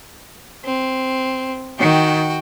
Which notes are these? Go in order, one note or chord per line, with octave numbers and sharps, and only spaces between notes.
C4
D#3 F#4 G5